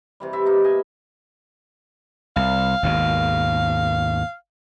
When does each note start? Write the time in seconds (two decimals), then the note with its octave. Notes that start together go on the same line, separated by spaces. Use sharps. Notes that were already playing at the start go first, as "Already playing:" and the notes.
0.20 C3 E3 G3
0.33 C3 E5
0.46 A#3 B3 D#4
0.64 D#5 E5 G#5
2.36 C2 F5
2.83 G#1 D#2 B2